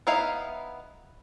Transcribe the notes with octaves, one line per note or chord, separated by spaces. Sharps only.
B3 D#4 E4 F5